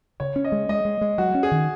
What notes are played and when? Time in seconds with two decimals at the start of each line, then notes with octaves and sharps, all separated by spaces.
0.20 C#3 C#5
0.36 C#4
0.44 D#5
0.52 G#3
0.69 G#3 D#5
0.85 G#3
1.01 G#3
1.18 F#3 F#4
1.35 C#4
1.43 G#4
1.51 D#3